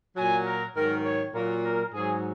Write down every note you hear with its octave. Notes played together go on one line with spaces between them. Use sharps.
A#2 F#3 G#5
A#4
G#2 D#3 F#3 A#4
C#5
A#2 F#3 A#4
A#4
G#2 F#3 G#4